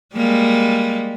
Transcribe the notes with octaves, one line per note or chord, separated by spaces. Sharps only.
G3 G#3 A#3